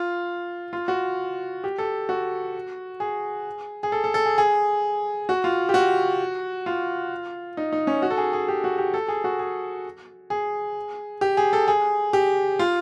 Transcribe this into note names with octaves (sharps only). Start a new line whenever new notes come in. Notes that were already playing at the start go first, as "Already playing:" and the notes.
Already playing: F4
F4
F#4
G4
A4
F#4
G#4
G#4
A4
A4
A4
G#4
G#4
F#4
F4
G4
F#4
F4
D#4
D#4
C#4
F#4
A4
G#4
G#4
G4
F#4
G4
A4
G#4
F#4
G#4
G#4
G4
G#4
A4
G#4
G4
F4